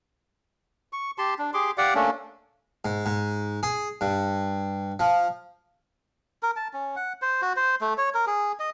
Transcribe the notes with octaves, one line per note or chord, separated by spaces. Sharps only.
C#6
G4 A5 C6
D4
G4 G#4 C6 D6
G4 D5 F5 F#5
A3 A#3 C#4 D4
G#2
G#2
G#4
G2
F3
A#4
A5
C#4
F#5
C5
F#4
C5
A3
C#5
A#4
G#4
D#5